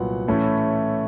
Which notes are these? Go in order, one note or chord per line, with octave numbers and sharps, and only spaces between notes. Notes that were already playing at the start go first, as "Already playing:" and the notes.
Already playing: C2 A#2 F#3 B3 F#5
A2 E3 A3 C#4 E4